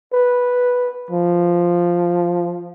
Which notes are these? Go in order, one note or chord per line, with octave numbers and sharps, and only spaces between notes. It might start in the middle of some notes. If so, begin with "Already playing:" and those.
B4
F3